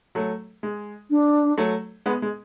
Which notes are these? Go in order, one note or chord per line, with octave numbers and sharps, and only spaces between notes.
F#3 A3
G#3
D4
F#3 A3
G#3 B3
G#3